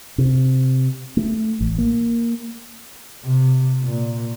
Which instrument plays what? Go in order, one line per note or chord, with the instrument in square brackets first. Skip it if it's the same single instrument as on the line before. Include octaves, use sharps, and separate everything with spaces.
[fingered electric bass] C3
A3
A1
A#3
[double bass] C3
A#2